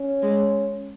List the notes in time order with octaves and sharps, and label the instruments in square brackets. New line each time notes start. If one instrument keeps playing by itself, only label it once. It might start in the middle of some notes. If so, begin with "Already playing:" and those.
Already playing: [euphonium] C#4
[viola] G#3